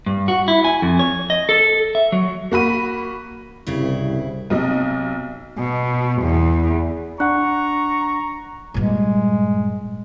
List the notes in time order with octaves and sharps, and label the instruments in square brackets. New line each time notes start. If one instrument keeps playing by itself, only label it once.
[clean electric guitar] G2
F#4
E4
G#5
F2
C#5
D#5
A4
E5
F#3
[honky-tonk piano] A#3 F#4 B5 D#7
[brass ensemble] C2 [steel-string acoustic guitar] G2 C#3 E4
[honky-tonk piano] B1 C3 D#5
[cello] B2
E2
[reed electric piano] D4 F#5 [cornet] A#5 [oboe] C#6 [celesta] F#6
[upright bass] G2 A#2 [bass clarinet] G#3